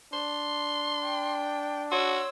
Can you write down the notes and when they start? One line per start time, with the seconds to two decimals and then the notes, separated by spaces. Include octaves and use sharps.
0.13 D4 C6
1.05 G5
1.92 F#4 C#5 C6 E6